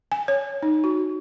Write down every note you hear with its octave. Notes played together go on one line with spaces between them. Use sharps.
G#5
C#5
D#4
F#4